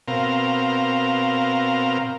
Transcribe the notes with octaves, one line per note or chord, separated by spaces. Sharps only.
B2 C4 A#4 F5